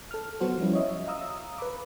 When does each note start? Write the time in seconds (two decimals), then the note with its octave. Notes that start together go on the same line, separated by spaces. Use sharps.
0.11 A4 F6
0.40 F#3 B3 F#4 C5
0.58 F3 G3 C#4 E4
0.73 C#5 D#5 E5
1.07 F5 A#5 D#6 E6
1.58 B4 B5 D6